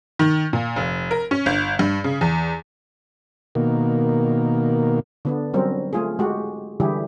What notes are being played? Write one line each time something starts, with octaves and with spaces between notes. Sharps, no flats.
D#3
A#2
F1
A#4
C#4
G1
G2
C#3
E2
B2 D#3 A#3
D3 B3 D4
F#3 G3 C4 C#4 A#4
A3 F4 G#4
G#3 F#4 G4
D3 E3 G3 E4 G4 G#4